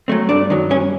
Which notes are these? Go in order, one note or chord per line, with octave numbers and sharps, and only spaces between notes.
F#3 A3 C4
G2 D4 D5
D#3 F#3
G2 C#4 C#5